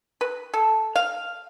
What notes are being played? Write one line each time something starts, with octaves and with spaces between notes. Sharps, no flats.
B4
A4
F5